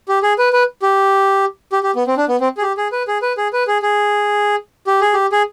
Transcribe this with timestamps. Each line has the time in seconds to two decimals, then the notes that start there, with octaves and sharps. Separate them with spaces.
0.08 G4
0.23 G#4
0.38 B4
0.53 B4
0.82 G4
1.72 G4
1.83 G4
1.96 B3
2.07 C4
2.17 D4
2.28 B3
2.40 C4
2.57 G#4
2.62 G4
2.77 G#4
2.92 B4
3.08 G#4
3.22 B4
3.37 G#4
3.53 B4
3.67 G#4
3.82 G#4
4.87 G4
5.01 G#4
5.13 G4
5.32 G#4